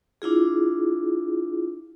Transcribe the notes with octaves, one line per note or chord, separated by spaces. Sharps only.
D4 E4 F4 G#4